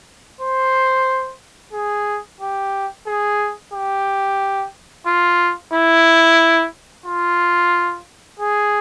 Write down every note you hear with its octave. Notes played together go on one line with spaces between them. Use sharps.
C5
G#4
G4
G#4
G4
F4
E4
F4
G#4